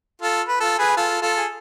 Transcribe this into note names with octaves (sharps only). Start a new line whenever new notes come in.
F4 A4
B4
F4 A4
G#4 B4
F4 A4
F4 A4
G#4